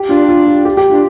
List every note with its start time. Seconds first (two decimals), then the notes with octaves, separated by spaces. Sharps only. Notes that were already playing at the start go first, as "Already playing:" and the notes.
Already playing: G4
0.09 D4 F4
0.29 F4
0.47 F4
0.65 G4
0.77 G4
0.90 D4 F4